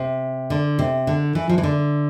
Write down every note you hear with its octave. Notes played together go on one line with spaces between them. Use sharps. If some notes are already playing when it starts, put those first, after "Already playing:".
Already playing: C3
D3
C3
D3
E3
F3
E3
D3